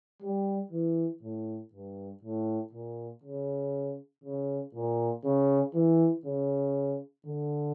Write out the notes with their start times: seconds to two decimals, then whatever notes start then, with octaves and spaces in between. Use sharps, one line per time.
0.23 G3
0.72 E3
1.23 A2
1.74 G2
2.23 A2
2.73 A#2
3.24 C#3
4.24 C#3
4.75 A#2
5.25 C#3
5.75 E3
6.25 C#3
7.26 D3